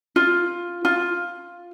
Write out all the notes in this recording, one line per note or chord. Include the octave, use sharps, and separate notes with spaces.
F4
F4